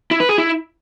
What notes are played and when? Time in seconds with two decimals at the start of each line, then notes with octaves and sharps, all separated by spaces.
0.11 E4
0.20 B4
0.29 G#4
0.38 E4